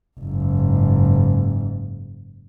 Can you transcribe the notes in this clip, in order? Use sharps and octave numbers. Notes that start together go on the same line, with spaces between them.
F#1 G#2